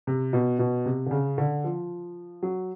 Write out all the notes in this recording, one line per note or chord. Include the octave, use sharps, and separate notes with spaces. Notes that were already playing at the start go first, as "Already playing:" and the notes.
C3
B2
B2
C3
D3
C#3
D3
F3
F#3